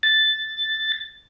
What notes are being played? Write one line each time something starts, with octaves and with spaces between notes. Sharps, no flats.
A6